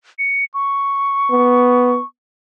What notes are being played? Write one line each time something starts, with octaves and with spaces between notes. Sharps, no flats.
C#7
C#6
B3